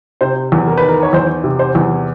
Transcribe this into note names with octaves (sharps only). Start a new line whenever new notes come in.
C3 C5
E2
A#4
D#3 B4
A#4
C#5
E2 C5
C3
C5
E2